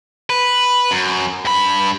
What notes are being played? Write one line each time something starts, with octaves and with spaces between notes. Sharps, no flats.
B4
F#2
G2 B5